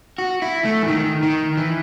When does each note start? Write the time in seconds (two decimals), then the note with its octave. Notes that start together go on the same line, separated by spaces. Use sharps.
0.18 F#4
0.42 E4
0.65 A3
0.83 E3
0.88 D#3
1.23 D#3
1.57 E3